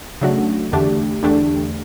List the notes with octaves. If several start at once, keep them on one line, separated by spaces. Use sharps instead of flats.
C#3 F#3 A3 D4 F#4
E2 D3 A3 D4 G4
E2 D3 A3 D4 G4